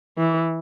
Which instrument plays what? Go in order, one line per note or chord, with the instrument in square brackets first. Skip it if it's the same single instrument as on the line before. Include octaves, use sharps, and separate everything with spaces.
[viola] E3